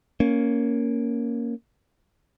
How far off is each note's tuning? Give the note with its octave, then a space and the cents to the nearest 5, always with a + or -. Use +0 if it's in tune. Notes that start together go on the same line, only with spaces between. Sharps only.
A#3 +0 C#4 +10